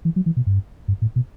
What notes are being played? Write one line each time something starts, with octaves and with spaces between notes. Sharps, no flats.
E3
F#3
E3
B2
G2
G2
A2
B2